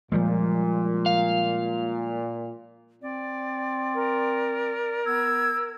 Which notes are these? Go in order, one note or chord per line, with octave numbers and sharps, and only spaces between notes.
A#2 F3 G3 G#3
F5
C4 D5
A#4
B3 E6 G#6